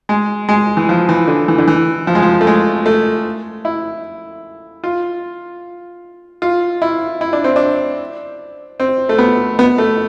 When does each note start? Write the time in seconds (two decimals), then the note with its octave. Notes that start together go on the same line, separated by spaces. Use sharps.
0.09 G#3
0.49 G#3
0.77 E3
0.89 F3
1.09 E3
1.28 D3
1.48 E3
1.58 D3
1.68 E3
2.07 F3
2.15 G#3
2.22 F3
2.41 A3
2.47 G#3
2.86 A3
3.65 E4
4.84 F4
6.42 F4
6.82 E4
7.21 E4
7.33 D4
7.44 C4
7.56 D4
8.80 C4
9.09 A3
9.18 B3
9.59 B3
9.78 A3